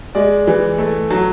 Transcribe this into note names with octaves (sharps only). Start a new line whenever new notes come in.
G#3 D5
E3
A3
F#3